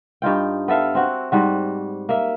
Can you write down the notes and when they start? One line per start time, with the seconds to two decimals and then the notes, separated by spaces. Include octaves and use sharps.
0.22 G2 D#4 F4 G5
0.68 B3 A4 E5 F5
0.95 C4 F#4
1.32 G#2 G3 F#4
2.09 A#3 E5